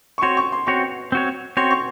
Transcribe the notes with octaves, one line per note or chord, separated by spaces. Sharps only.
C#6
C4 F#4 C#5 C6
C#6
C6
C4 F#4 C#5 C#6
C4 F#4 C#5
C4 F#4 C#5 C6
C#6